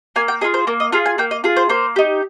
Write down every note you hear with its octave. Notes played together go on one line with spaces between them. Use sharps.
A#3 G#5
G5
F4 G#4 D#5
C5
A#3 A#4
D#5
F4 G#4 F5
G#5
A#3 G5
D#5
F4 G#4
C5
A#3 C5
D#4 G4